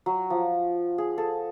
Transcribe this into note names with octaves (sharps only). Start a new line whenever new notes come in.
F#3
F3
G#4
A4